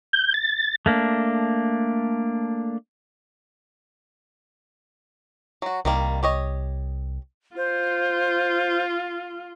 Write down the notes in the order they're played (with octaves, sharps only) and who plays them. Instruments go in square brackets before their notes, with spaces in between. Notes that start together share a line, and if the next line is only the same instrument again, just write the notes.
[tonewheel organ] G6
A6
[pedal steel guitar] A3 A#3 D4
[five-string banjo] F#3 F#4
[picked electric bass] C2 [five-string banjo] D#3 G3 A#3
[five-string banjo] G4 C#5 D#5
[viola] F4 [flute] C5